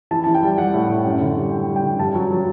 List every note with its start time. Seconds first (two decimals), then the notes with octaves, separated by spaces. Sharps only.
0.11 E3 A5
0.24 E3 A5
0.35 G5
0.43 G3
0.58 G3 F#5
0.74 A2
0.89 A2
1.05 F#2
1.21 D3
1.36 G3
1.52 F#2 G5
1.68 G3
1.76 G5
1.83 D3
1.99 G2 A5
2.15 F#3
2.31 F#3